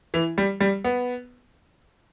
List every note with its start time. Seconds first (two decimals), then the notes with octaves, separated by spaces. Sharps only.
0.14 E3
0.38 G3
0.60 G3
0.84 B3